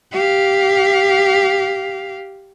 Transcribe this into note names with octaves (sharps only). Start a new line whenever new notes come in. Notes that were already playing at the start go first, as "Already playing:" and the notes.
G4 F5